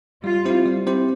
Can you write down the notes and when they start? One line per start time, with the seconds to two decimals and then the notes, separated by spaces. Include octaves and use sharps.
0.24 G3 F4
0.45 C4 E4 G4 C5
0.66 G3
0.87 C4 E4 G4 C5